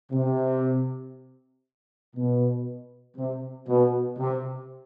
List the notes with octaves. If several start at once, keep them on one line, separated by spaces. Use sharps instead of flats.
C3
B2
C3
B2
C3